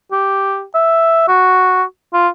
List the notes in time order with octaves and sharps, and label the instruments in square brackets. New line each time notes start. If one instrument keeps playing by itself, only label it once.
[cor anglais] G4
E5
F#4
F4